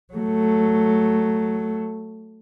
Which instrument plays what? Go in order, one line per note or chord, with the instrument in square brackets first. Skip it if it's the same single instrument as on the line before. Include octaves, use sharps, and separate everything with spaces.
[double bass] F#3 A3